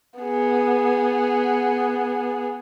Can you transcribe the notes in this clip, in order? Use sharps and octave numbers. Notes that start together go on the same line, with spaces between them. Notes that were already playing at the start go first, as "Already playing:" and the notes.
B3 G#4